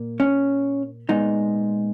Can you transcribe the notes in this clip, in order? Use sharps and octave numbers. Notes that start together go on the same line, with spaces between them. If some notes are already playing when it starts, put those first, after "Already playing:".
Already playing: A#2 A#3
C#4
A#2 G#3 B3 D#4